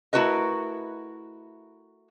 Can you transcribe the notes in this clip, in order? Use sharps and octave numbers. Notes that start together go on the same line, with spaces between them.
A3 E4 F#4 A#4 B4 D#5